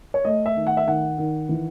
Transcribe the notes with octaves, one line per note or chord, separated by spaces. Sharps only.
C#5
A3 D#5
E5
D#3
F#5
E5
D#3 F#5
D#3
E3